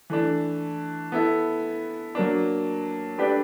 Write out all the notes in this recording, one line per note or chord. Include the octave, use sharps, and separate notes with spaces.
E3 A3 D4
B3 E4 A4
F#3 A#3 D4
A3 D4 G4 B4 D5